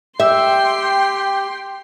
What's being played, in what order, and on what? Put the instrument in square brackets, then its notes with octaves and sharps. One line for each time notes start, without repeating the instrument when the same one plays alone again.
[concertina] G4 [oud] E5 [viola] G5 C6